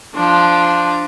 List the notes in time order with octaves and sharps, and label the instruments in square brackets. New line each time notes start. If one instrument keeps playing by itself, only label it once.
[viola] F3 D4